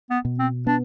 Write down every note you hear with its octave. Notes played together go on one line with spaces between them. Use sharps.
B3
B2
C4
B3 D4